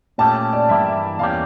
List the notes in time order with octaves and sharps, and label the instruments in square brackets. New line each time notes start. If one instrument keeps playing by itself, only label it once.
[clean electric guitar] A#2 A3 C#4 G4 [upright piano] A5
[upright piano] D5
[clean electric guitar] G2 E3 A#3 E4 G4 [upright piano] E5
[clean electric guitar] E2 E3 A#3 C#4 G4 [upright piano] F5